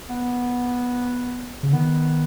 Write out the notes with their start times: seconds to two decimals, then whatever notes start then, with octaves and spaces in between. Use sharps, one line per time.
0.09 B3
1.63 C#3
1.73 D#3 B3